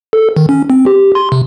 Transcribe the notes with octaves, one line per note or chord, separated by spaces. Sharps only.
A4
D#3
C#4
C4
G4
C6
C3